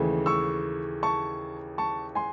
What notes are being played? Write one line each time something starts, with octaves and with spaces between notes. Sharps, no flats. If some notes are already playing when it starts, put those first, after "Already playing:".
Already playing: D#2 C#3 E3 A3
C#6 E6
A5 C#6
A5 C#6
G#5 C6